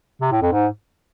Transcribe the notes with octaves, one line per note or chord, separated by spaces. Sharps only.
C3
A2
F2
G#2